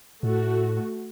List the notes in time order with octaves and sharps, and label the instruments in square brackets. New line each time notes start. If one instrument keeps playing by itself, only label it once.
[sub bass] A2 [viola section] A3 F#4